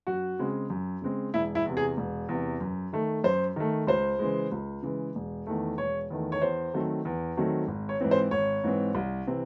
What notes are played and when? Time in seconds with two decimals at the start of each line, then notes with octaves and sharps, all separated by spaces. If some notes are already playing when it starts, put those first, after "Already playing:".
0.07 F#2 F#4
0.39 C#3 G#3 C4
0.70 F#2
1.02 C#3 G#3 C4
1.34 E1 E4
1.55 E4
1.65 E2 C3
1.77 G#4
1.97 E1
2.29 E2 C3
2.61 F#2
2.93 D#3 A3
3.24 F#2 C5
3.56 D#3 A3
3.87 C#2 C5
4.19 C#3 E3 G#3
4.52 C#2
4.82 C#3 E3 G#3
5.15 E1
5.47 E2 D#3 A3
5.78 E1 C#5
6.10 E2 D#3 A3
6.32 C#5
6.41 E2 C5
6.74 D#3 F#3 A3 C4
7.05 E2
7.37 D#3 F#3 A3 C4
7.68 G#1
7.89 C#5
8.01 G#2 E3 C4
8.11 C5
8.31 G#1 C#5
8.64 G#2 E3 C4
8.95 C2
9.27 C3 E3 C4